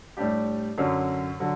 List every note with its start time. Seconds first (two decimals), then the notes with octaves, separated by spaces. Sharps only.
0.17 A2 G3 D4 G4
0.78 F#2 D3 F#3 C#4
1.40 D3 F#3